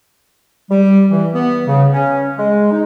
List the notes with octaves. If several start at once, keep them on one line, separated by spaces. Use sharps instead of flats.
G3
E3
B3
C#3
C#4
G#3
D#4